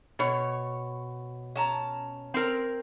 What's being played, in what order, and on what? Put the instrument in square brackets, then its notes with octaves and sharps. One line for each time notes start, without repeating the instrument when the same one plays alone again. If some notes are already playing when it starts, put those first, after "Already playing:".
[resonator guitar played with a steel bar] B2 C#5
[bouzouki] C#4 A5 A#5
[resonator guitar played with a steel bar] C4 A#4